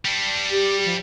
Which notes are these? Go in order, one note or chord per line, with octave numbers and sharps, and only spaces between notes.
G3 D4
G4
F3